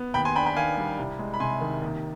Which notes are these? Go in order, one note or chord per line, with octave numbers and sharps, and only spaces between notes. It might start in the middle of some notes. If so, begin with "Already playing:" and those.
Already playing: B3
D#2 G5 B5
G#5 C6
D4 G5 B5
G5 B5
D#3 F5 G#5
G3
C2
G#3
B5
C3 G#5 C6
D#3
D#2